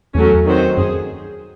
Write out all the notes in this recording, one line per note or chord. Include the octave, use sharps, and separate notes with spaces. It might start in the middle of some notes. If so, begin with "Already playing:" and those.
E2 F#3 A3 C#4
D#3 F#3 C4 F#4 C5
F#2 G#4